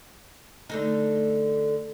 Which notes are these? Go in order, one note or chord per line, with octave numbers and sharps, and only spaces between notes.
D3 A3 D#4